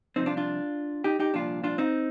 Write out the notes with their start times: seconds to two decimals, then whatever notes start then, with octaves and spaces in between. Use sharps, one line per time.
0.16 C2 C3 F3 C4 D#4
0.26 D4 F4
0.37 D4 F4
1.04 D#4 G4
1.20 D#4 G4
1.34 C2 A#2 F3 D4 F4
1.64 D4 F4
1.78 C4 D#4